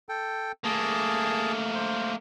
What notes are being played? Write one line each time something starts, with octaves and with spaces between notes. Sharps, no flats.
A4 G5
A3 A#3 G#4 A5
C5